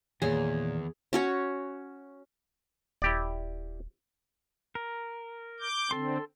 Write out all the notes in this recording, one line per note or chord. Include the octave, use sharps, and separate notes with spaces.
E2 A#2 D#3 G#4 C#5
C#4 F#4 C#5
D#1 E4 G4 D5
A#4
D6 G6
D3 C4 A4 C6